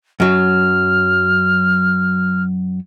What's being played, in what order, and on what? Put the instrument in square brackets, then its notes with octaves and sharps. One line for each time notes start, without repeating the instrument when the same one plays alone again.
[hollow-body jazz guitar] F#2 F#3 [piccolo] F6